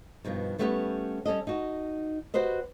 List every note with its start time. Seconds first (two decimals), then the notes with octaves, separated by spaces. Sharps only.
0.24 G2 B2 D#3 F3
0.59 G3 A3 B3 C#4 F4 G4
1.25 G3 C#4 A4 D#5
1.47 D#4 F#4
2.34 F#4 G4 B4 C5 D#5